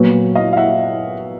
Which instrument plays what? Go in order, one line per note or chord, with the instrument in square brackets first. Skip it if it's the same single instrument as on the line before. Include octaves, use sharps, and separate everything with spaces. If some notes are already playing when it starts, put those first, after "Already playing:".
Already playing: [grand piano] A#2 F#3 B3
[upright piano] D#5 F5
F5
E5 F#5